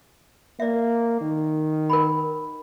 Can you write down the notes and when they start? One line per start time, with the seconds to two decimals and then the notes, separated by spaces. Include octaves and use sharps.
0.60 A#3 D5 E5
1.21 D#3
1.90 A#4 B5